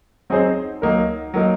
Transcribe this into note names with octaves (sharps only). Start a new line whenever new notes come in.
F#3 C4 D#4 G#4 C5
F#3 A#3 D#4 A#4
F#3 A#3 D#4 A#4